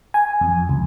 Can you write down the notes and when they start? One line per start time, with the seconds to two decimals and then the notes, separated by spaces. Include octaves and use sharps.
0.14 G#5
0.41 F2
0.69 C#2